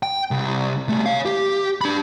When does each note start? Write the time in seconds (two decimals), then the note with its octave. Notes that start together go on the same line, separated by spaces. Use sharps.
0.03 G5
0.31 C2
0.89 G3 A3
1.06 C#5 F5
1.26 G4
1.81 D4 B5